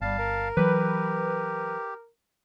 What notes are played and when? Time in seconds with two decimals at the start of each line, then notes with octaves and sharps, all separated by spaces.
0.01 G1 G3 F5 A5
0.19 A#4
0.57 E3 F#3 G4 B4